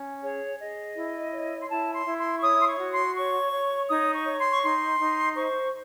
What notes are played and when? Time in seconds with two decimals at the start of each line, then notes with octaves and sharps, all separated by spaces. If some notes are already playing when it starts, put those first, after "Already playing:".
Already playing: C#4
0.22 G#4 C#5
0.59 G#4 D#5
0.96 E4
1.33 C#5
1.59 C6
1.69 E4 A5
1.94 C6
2.06 E4
2.18 C6
2.39 C#6
2.42 C#5 D#6
2.62 C6
2.67 C#6
2.79 F#4
2.92 C6
3.16 C#5 C#6
3.53 C#5
3.89 D#4 D#6
4.14 C#6
4.26 C#5
4.39 C6
4.52 C#6
4.63 D#4 C6
5.00 D#4
5.36 C5 C#6